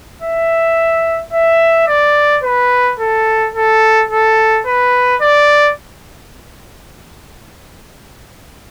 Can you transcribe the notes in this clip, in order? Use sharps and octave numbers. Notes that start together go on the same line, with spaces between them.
E5
E5
D5
B4
A4
A4
A4
B4
D5